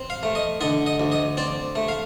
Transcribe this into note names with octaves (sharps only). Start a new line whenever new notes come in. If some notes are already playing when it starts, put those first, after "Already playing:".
Already playing: C4
F5
A3
D#5
D3 D#5
D#5
D2
D#5
C4 D5
A3
F5